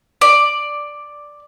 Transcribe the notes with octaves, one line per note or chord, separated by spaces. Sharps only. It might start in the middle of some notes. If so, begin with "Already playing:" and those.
D5